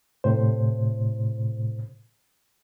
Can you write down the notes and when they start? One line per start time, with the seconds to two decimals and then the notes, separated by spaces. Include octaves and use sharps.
0.24 A2 C3 C5